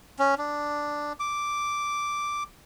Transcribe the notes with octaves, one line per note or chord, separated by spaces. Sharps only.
C#4
D4
D6